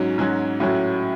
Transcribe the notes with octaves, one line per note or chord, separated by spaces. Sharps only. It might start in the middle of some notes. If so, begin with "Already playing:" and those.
Already playing: G#2 F#3 C#4 F#4
G#2 F#3 C#4 F#4
A2 F#3 C#4 F#4